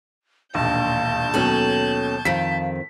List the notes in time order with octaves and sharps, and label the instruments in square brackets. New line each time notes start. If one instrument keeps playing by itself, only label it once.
[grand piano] E1 A#1 D#2 [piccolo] F5 [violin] A5 G6
[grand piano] D#2 B2 F#3 [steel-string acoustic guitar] C#4 A4 [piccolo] F#7
[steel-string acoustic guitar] F2 D#3 [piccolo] F5 [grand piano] B6